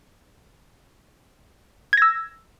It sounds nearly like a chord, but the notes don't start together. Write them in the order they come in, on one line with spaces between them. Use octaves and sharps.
G#6 A#6 E6